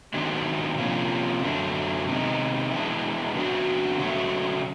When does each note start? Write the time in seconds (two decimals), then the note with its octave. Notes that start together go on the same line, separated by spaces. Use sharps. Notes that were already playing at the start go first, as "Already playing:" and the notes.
0.14 G#2 D#3 F#3 B3 D4
0.78 C3 F3 A#3 C#4 F4
1.43 F#2 D3 F#3 A3 D4
2.07 C3 D#3 G#3 B3 D#4
2.71 E3 G#3 B3 D4
3.35 C#3 F#3 B3 D4 F#4
3.98 C#3 F#3 A3